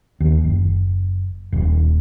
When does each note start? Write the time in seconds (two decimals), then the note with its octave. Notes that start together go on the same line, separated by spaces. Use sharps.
0.20 D#2
0.44 F#1
1.52 D#1